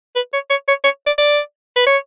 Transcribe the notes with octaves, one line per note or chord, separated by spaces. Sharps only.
B4
C#5
C#5
C#5
C#5
D5
D5
B4
C#5